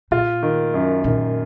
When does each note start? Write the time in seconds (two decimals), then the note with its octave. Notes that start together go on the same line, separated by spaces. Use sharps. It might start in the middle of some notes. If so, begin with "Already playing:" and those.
0.11 A#2 F4
0.43 D#3
0.74 F#2
1.04 A#2 D#3